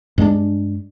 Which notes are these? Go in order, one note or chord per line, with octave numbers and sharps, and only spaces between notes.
G2 G#3 B3 D4